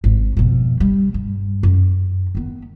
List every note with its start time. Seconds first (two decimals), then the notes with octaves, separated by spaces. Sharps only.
0.04 G#1
0.37 F2 B2
0.80 G3
1.14 G2
1.63 F#2
2.35 D#3 B3